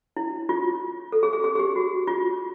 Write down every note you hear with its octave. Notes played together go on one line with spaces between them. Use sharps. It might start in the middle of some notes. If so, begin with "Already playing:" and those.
E4
F4
A4
G#4
G#4
G#4
G#4
G4
F#4
F4